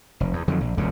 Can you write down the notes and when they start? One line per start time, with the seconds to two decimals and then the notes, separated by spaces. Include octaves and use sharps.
0.20 F1
0.33 E2
0.48 F2 D3 D#3 F#3
0.61 A#1
0.77 E1 C#2 F#2 C#3